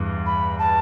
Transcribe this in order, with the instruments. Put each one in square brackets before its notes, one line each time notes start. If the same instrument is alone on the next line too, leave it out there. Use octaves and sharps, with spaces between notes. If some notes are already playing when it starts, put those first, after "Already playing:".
Already playing: [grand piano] E2 G2
[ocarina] B5
A5